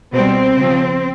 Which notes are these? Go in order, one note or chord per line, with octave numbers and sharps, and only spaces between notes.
B2 G3 C4
C#3 F3